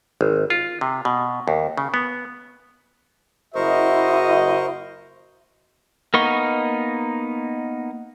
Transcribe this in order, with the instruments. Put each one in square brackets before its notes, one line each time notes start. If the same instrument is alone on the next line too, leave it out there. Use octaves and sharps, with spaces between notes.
[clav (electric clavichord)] G#1
F4
C3
B2
D#2
C#3
B3
[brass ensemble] F#1 F#4 D#5 [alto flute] E4 [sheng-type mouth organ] A#4 C5 C#6
[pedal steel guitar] A#3 B3 D#4 D#5 C#6